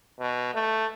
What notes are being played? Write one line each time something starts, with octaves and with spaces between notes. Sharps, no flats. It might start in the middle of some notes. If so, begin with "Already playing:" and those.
B2
A3